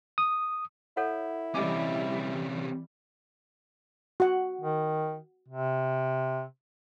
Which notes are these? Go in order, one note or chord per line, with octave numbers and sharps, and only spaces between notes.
D#6
E4 A4 C#5 F#5
C3 E3 G3 C#4 D#5 D6
F#4 F#5
D#3
C3